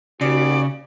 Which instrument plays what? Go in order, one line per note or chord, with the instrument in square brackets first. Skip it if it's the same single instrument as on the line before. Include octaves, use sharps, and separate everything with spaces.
[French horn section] D#2 F#4 [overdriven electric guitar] C#3 [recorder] D5